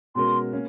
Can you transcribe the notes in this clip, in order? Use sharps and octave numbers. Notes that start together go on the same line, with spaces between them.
B2 G#3 C#4 F#4 A#4 C6
A#3 C#4